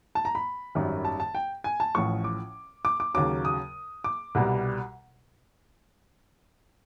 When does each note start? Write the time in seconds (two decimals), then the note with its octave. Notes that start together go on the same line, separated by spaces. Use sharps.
0.15 A5
0.25 A#5
0.35 B5
0.75 G#1 F#2 D#3 G3
1.05 A5
1.20 A5
1.35 G5
1.64 G#5
1.80 A5
1.95 A1 A2 F3 C#6
2.24 D6
2.85 D6
3.00 D6
3.14 D#2 C#3 F#3 D6
3.45 D#6
4.04 D6
4.35 C2 B2 G3